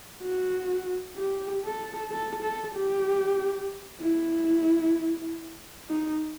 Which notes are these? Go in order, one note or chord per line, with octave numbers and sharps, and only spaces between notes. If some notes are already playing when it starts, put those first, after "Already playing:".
F#4
G4
A4
A4
A4
G4
E4
D#4